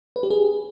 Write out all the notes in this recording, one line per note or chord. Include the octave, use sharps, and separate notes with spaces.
B4
G4
G#4